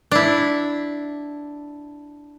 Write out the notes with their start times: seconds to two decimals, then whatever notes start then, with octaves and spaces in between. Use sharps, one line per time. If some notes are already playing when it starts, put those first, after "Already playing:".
0.11 D4 E4